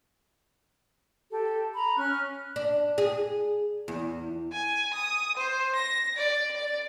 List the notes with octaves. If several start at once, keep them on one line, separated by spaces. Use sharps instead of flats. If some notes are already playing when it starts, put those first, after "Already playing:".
G4 A4
A#5 B5
C#4 C#6 F6 F#6
D4
G#4
E2
G#5
D#6
C5
A#6
D5
D5